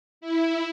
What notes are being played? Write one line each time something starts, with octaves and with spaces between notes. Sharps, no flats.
E4